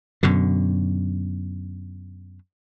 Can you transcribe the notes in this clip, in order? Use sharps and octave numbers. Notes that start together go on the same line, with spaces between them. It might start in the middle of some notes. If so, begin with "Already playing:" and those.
F#2 B2 D3